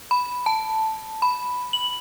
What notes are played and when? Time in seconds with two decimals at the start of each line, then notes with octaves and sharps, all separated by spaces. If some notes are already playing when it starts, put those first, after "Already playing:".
0.11 B5
0.46 A5
1.22 B5
1.73 F#7